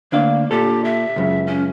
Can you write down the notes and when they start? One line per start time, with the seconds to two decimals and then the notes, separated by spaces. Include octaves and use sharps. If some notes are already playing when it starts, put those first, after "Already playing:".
0.12 D2 A#3 D4 F5
0.51 A#2 G4 A4
0.85 E5
1.16 C#2 F#2 C#3
1.47 C#4